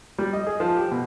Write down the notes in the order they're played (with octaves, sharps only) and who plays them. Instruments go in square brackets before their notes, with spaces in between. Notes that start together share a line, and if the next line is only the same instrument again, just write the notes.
[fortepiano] G3
D#5
G#4
F3
G4
B2